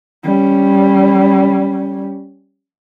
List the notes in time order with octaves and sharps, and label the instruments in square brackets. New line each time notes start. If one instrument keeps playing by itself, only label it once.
[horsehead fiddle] G3 C#4